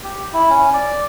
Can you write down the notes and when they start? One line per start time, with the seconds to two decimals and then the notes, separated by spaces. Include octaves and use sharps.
0.04 G4
0.34 E4
0.50 C#4
0.74 D5